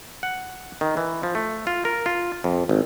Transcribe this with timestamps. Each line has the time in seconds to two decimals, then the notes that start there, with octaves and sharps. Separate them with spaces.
0.23 F#5
0.81 D#3
0.97 E3
1.23 F3
1.35 A3
1.67 F4
1.85 A#4
2.06 F4
2.44 F2
2.69 G#1